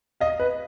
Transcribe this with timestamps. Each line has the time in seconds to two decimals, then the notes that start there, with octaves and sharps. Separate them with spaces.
0.20 D#5 F5
0.40 B4